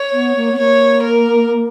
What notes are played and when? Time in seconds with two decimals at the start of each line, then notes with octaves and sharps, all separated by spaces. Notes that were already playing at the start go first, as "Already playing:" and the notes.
Already playing: C#5
0.13 B3
0.35 A#3
0.52 B3
0.58 A#3 C#5
1.02 A#4